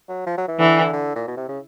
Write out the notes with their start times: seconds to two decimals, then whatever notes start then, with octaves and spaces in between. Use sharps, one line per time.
0.09 F#3
0.26 F3
0.38 F#3
0.48 E3
0.59 D3 E3
0.93 D3
1.16 A#2
1.28 B2
1.37 C3
1.48 C#3